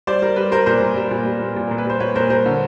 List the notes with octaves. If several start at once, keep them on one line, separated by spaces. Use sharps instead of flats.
G3 C5 D5
G3 A#4
G3 B4
G3 A#4 C5
A#2 A#4 C5
A#2
G3
A#2
G3
A#2
A#2
A#2 A#4
B4
G3 C5
A#2 B4 C#5
A#2 A#4 C5
G3 A#4 C5
D3